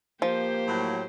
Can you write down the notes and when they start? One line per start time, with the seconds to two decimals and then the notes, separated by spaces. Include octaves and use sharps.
0.22 F3 A#3 G4 C5
0.68 A2 F#3